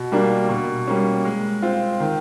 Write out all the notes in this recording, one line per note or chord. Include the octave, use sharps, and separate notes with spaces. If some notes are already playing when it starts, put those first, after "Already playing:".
Already playing: B2
G3 A#3 D4
B2
G3 A#3 C#4
G#3
C4 F4
D#3